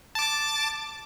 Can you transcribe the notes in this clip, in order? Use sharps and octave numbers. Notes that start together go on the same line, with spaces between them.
A5 D6 A6